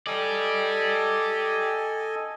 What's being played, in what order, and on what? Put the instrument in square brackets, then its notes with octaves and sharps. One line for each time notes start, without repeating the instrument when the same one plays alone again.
[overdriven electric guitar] G4 D5 [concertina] A4 D#5 G#5